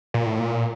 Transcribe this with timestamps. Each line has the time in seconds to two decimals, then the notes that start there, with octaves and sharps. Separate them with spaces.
0.14 A#2
0.26 A2
0.39 A#2